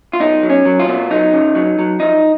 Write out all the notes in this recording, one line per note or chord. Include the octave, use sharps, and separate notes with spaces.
F4
B2 D#4
F#3
C#4
F#3
F4
B2
F#3 D#4
C#3
F#3
F#3
F3 D#4